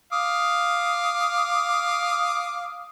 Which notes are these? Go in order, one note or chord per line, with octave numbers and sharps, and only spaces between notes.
F5 D6 D#6